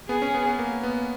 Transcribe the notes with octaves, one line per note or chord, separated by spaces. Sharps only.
B3 G#4
C#4
B3
B3
A#3
B3